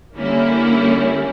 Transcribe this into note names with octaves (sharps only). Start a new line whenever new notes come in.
D3 G3 A#3 C#4 E4